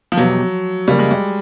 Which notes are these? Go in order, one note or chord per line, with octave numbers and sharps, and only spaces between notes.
F3
E2 B2 F#3 G3
C#3 F3 G3 A#3
G#3
G3